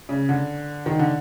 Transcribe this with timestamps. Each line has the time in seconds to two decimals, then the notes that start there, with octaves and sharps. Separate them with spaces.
0.09 C#3
0.29 D3
0.86 D#3
0.99 D3